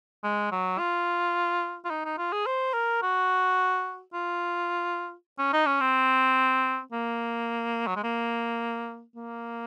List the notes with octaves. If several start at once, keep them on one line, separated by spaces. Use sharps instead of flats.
G#3
F#3
F4
F4
D#4
D#4
F4
G#4
C5
A#4
F#4
F4
C#4
D#4
C#4
C4
A#3
F#3
G#3
A#3
A#3